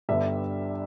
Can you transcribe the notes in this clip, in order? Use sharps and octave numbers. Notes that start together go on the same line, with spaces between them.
G1 G2 D3 G3 E5